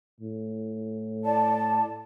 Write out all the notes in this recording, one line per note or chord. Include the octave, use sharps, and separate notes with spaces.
A2
D5 A5